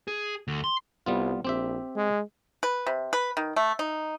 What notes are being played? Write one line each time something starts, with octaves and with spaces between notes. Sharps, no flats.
G#4
D2
C6
C2 G3 B3 F4
A#1 C4 G4 E5
G#3
B4
C3
B4
D#3
A3
D#4